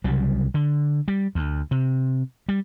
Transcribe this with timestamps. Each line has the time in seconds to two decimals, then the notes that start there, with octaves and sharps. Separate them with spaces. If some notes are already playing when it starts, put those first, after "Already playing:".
0.04 C2 C#3 F#3 G3
0.54 D3
1.08 G3
1.35 D2
1.71 C3
2.49 G3